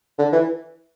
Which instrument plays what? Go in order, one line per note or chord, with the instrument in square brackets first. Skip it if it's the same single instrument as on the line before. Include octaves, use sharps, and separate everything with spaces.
[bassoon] D3
E3